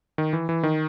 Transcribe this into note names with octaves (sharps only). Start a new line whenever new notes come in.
D#3
E3
E3
D#3